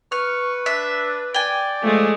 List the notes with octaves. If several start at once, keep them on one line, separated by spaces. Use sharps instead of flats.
B4 C#6 F6
D4 E5
D5 G5 G#5
F3 G#3 A3